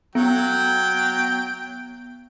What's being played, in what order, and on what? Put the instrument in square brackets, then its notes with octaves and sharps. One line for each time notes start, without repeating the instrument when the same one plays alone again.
[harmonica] F#3 G5 [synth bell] B3